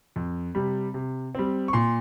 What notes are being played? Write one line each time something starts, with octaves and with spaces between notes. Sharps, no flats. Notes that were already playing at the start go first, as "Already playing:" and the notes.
F2
C3 G3
C3
G3 C4
C#6
A#2 C6